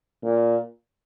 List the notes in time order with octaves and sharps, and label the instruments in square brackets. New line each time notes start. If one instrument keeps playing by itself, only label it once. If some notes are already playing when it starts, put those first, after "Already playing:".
[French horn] A#2